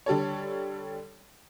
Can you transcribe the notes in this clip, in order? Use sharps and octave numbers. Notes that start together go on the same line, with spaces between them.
D3 G3 A4 C#5